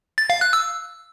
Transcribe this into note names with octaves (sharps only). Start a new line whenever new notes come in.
A6
F5
F#6
E6